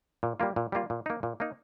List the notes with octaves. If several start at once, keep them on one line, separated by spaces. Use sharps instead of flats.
A#2
G3 A#3 F4
A#2
G3 A#3 F4
A#2
A#3 D#4
A#2
A#3 D#4